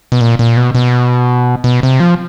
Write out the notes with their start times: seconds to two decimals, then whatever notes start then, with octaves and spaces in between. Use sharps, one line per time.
0.12 B2
0.21 A#2
0.39 A#2
0.57 B2
0.75 B2
1.64 B2
1.83 C3
2.00 F3